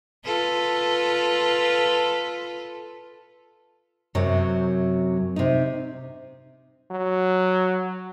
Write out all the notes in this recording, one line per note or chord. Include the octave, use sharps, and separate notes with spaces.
F4 A4 B4
F#2 C3 F#3
C3 D#4
F#3